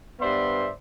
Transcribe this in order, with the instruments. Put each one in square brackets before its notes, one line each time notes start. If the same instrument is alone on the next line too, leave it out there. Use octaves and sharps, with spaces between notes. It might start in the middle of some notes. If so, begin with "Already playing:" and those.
[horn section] G2 B3 C5 D5 E5 C6